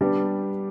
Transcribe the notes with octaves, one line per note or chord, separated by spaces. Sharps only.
G3 B3 D4 G4